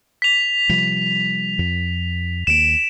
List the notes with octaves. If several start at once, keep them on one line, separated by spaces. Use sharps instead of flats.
B6 F7
C3 F3 G3
F2
D#2 A#3 D7 E7